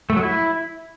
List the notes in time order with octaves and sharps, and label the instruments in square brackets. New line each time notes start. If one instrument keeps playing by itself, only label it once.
[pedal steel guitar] A3
F#3
E4